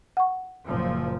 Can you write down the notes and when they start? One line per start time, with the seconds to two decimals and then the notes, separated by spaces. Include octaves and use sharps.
0.17 F#5 C#6
0.66 F#1 A#2 F3